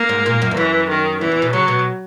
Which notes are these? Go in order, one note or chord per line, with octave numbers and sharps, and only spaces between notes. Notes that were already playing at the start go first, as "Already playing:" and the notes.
Already playing: A#3
G#2
A#2
F#2
E2
F#2 E3
D#3
E2 E3
E2
B2
C#3 F#3
B2